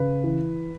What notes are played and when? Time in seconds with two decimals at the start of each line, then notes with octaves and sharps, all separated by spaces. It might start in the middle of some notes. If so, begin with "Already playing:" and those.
Already playing: C#3 B4
0.24 E3